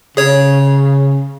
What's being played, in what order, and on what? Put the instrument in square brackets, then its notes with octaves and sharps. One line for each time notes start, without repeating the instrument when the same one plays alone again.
[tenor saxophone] C#3 [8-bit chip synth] G#4 C#5